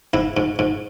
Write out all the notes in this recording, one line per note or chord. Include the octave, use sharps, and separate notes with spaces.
G#2 E4
G#2
G#2